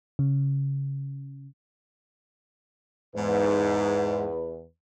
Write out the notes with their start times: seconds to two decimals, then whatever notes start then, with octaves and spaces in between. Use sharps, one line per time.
0.19 C#3
3.16 E2 G#2 B4